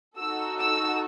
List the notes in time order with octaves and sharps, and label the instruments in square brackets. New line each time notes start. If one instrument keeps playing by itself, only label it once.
[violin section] D#4 F#4 A4 E6
E6